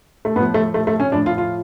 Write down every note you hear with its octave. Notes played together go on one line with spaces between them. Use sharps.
A3
A2 F3 B3
A3
A3
A3
C#4
A2 F3 D4
F4
F4